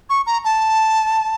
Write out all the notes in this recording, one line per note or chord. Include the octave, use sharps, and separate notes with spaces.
C#6
A#5
A5